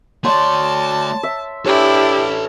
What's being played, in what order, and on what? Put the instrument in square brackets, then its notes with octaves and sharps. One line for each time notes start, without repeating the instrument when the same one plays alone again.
[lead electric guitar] A3 D5 [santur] C#5 C6 C#6 [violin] A5
[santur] E5
[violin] D4 E4 [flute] G4 [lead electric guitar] A4 B4 [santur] C#5